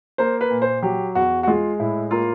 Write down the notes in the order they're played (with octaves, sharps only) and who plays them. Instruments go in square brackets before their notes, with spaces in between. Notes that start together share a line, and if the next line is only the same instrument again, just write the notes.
[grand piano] A#3 C5
B4
A#2
C5
F#3 G4
E2 F#4
F#4
G#3 F4
A2 E4
A#3 F4